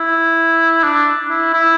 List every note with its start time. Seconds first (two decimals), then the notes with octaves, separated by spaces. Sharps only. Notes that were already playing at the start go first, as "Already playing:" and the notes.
Already playing: E4
0.83 D4
1.30 E4
1.54 E4